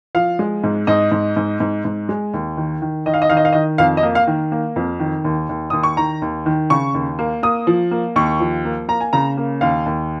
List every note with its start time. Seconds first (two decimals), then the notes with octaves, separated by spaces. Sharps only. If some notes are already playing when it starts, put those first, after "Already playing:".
0.15 F3 F5
0.39 G#3
0.64 G#2
0.87 G#2 D#5
1.12 G#2
1.37 G#2
1.60 G#2
1.85 G#2
2.09 G#3
2.34 D#2
2.57 D#3
2.82 D#3
3.06 D#3 D#5
3.14 F5
3.22 D#5
3.30 D#3 F5
3.37 D#5
3.45 F5
3.53 D#3 D#5
3.78 F2 F5
3.97 D#5
4.03 A#3
4.15 F5
4.27 D#3
4.52 A#3
4.76 F2
5.00 D#3
5.25 D#2
5.49 D#2
5.70 D#2 D#6
5.83 C#6
5.97 D#3 A#5
6.22 D#2
6.46 D#3
6.70 C#3 C#6
6.94 D#2
7.19 A#3
7.43 A#3 D#6
7.67 F3
7.91 A#3
8.16 D#2 C#6
8.40 F3
8.65 A#3
8.88 A#3 A#5
9.01 G#5
9.13 C#3 A#5
9.37 A#3
9.61 D#2 F5
9.86 D#2